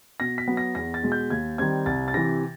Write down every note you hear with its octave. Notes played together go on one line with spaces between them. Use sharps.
B2 A#6
B6
F#3 B3
A#6
E2 A#6
A6
B2 G#3
G6
D#2 G#6
D#3 G3 C4 G#6
C2 A6
A6
C3 E3 A#6